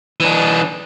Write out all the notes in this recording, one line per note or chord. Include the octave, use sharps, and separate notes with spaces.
E3 D4